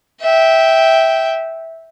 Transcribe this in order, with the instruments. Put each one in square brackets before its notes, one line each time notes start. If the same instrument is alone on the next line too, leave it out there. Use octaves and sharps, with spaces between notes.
[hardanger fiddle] E5 G5